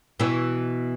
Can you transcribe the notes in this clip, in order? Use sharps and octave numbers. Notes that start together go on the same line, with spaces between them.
B2 E3